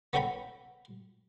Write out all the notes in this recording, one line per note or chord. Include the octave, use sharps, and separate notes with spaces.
B3 C#4 A4 G5 A#5 B5